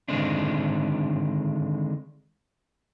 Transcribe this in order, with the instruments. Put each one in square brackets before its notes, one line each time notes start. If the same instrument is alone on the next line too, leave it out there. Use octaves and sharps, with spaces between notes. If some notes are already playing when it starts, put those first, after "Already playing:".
[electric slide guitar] D3 D#3 G#3 C4 D4